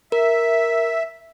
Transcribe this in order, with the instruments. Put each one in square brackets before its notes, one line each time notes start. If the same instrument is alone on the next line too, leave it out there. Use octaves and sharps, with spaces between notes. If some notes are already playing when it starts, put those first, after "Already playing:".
[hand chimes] A#4 [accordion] E5